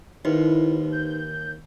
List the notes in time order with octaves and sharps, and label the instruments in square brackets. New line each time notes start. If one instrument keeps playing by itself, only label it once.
[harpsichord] D#2 [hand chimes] D#4 B4 C5 [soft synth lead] E4
[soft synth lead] G6